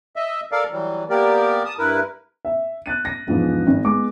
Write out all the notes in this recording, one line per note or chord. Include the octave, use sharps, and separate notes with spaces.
D#5 E5
A4 A#4 D5 F5
E3 F#3 G3
A#3 B3 G4 A#4 D5
A5 D#6
G2 E4 A#4 B4
E5
F#6 A6 D#7
A#6
E1 G#2 F3 B3
G#1
G#3 B3 D6